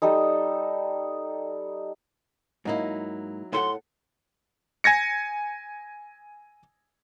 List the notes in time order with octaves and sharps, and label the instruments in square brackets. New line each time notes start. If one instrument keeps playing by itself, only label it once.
[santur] G3 D#4 A4 D#5
[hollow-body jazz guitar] G#2 A#3 [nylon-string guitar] F#3 D#4 E4
[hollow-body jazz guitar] A2 A4 F#5 [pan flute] C6
[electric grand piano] G#5 G#6 A#6 C#7